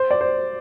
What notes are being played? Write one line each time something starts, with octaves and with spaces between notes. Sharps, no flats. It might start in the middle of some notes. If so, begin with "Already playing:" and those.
Already playing: C5
D5
C5